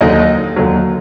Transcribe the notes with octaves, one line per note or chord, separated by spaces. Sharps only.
D#2 D3 F#3 D#4 D#5
D#2 D3 F#3